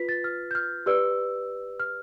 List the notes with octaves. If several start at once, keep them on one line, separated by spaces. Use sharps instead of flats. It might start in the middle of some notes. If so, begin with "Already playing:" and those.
Already playing: F4 B4 B6
A6
F6
G6
F6
G4 B4 D5 E6
F6